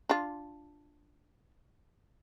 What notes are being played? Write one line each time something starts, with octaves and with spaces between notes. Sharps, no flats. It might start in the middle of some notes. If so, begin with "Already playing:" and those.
D4 F4